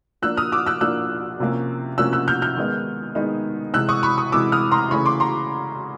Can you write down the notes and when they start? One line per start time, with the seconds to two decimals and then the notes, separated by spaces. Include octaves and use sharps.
0.22 F3 A#3 D4 E6 F#6
0.37 D#6 F6
0.52 D6 E6
0.66 E6 F#6
0.81 F3 A#3 D4 E6 F#6
1.40 C3 F3 A#3 C#4
1.98 C3 F3 A#3 C#4 E6 F#6
2.13 E6 F#6
2.28 F6 G6
2.42 F6 G6
2.57 D#3 G#3 B3 D#4
3.15 D#3 G#3 B3 D#4
3.73 C3 E3 G#3 E6 F#6
3.89 C#6 D#6
4.03 B5 C#6
4.18 C#6 D#6
4.32 C3 E3 G#3 D6 E6
4.52 D#6 F6
4.71 A#5 C6
4.91 C#3 E3 A3 C#4 B5 C#6
5.06 C6 D6
5.20 A#5 C6